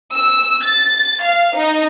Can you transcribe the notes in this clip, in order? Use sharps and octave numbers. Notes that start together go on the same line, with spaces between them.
E6
A6
F5
D#4